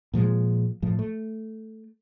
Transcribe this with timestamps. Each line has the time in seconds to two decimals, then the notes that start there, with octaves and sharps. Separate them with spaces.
0.14 A#2 F3 F#3 G#3
0.82 A2 F3
0.99 A3